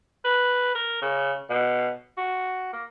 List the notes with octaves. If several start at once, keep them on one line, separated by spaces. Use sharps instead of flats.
B4
A#4
C#3
B2
F#4
A#3